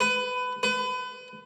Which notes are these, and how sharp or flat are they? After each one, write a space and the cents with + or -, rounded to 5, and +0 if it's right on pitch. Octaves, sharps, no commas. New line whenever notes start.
B4 +20
B4 +30